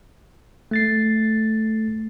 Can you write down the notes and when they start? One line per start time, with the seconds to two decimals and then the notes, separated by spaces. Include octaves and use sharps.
0.71 A3 A6 C7